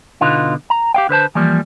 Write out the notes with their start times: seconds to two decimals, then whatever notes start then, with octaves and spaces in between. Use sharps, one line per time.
0.21 B2 D3 B3 D#4 F4
0.70 A#5
0.94 G4 F5 G5
1.09 D3 B4 C5 A5
1.35 E3 F3 G3 A#3